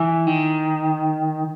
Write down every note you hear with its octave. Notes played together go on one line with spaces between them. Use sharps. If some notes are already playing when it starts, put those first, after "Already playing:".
Already playing: E3
D#3